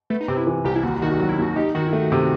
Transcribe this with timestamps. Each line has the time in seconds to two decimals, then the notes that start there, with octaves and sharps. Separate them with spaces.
0.10 A3 B3
0.21 D#4
0.28 C3 C4
0.37 E4
0.47 E3
0.64 C2 G4
0.76 E4
0.83 D#2 F#4
1.02 D#3 F#4
1.19 F#3
1.29 E4
1.38 D#2 F#4
1.56 D#4 G4
1.75 D#3 F#4
1.88 E4
1.93 A3 F#4
2.12 C3